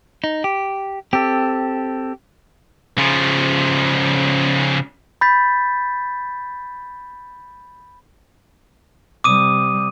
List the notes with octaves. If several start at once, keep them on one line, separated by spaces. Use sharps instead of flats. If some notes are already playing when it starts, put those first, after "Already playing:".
D#4
G4
C4 G4 A4
C#3 F3
B5 G6 A6 B6
C3 G3 D6 D#6 D#7